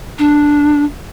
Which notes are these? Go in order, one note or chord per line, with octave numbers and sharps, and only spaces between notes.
D4